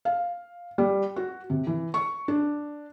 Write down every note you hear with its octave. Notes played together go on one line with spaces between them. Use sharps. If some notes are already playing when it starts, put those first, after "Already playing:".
F5
G3
F#4
C3
E3
C#6
D4